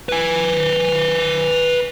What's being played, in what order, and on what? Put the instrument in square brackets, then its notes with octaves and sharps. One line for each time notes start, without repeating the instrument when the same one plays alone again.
[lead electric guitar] B4 G#5